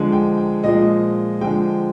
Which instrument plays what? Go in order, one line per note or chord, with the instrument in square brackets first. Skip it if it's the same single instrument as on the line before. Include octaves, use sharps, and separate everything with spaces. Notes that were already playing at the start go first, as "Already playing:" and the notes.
Already playing: [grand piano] D3 F3 G#3
G5
G5
A#2 F3 G#3 D#5
D3 F3 G#3 G5